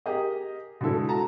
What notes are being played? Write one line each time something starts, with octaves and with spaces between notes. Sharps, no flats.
G4 G#4 A#4 D#5
B2 D3 G#3 E4 A4
F#4 A5 A#5